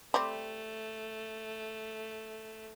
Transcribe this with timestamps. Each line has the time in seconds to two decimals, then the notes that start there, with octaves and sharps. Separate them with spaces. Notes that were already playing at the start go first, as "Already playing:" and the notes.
0.14 G3 A3 C4